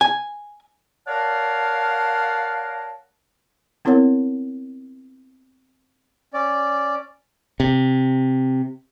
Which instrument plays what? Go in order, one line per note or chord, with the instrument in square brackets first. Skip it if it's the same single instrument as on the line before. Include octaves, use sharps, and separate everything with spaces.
[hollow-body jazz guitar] G#5
[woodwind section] A#4 C#5 D5 F5 F#5 A5
[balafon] B3 C4 E4 A#4 C#5 F#5
[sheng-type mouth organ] C#4 D5
[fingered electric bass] C3